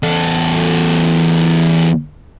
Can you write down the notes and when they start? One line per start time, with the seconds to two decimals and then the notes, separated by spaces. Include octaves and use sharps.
0.03 E2 A4